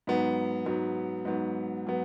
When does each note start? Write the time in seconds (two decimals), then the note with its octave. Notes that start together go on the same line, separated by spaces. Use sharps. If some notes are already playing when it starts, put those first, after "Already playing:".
0.07 G#2 F#3 B3
0.66 G#2 F#3 B3
1.25 G#2 F#3 B3
1.87 F#3 B3